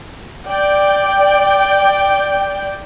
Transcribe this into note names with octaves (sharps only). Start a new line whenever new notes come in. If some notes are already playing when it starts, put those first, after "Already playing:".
D5 G5